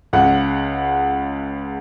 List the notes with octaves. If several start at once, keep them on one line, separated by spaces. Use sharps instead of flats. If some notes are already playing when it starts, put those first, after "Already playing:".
C#2 C#3 F#5